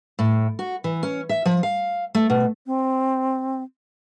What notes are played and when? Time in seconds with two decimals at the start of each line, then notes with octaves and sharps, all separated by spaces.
0.19 A2
0.59 F#4
0.84 E3
1.03 C#4
1.29 E5
1.45 F3
1.63 F5
2.15 A3
2.30 B2
2.66 C4